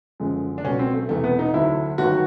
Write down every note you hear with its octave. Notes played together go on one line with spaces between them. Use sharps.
F#1 F#2 D3 F3 G#3
D4
C#2 B2 F#3 C#4
C4
A3
E1 E2 C3 A3
B3
D#4
D2 D3 F#3 E4
G1 G2 D#3 F#3 F#4